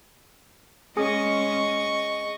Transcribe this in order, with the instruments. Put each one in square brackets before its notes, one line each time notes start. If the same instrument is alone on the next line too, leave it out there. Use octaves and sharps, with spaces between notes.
[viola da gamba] G#3 C#4 [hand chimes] G#4 G#5 D#6 [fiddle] D#5 C#6